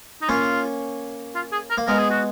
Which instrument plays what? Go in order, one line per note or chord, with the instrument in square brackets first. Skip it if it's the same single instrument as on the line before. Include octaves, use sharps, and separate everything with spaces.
[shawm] D#4
[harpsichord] A#3 C#4 [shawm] F4
[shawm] F4
G#4
A#4
[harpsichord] A#3
[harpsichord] G#3 B3 [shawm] A#4
[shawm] G#4
F#4